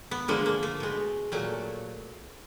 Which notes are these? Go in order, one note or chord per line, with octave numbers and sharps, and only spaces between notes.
B3
D3 F3 G#3 A#3
A#3
A3
B2 G#3
A#2 F#3 A3